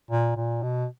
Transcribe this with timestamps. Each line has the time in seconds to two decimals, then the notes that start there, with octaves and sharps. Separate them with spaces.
0.11 A#2
0.36 A#2
0.63 B2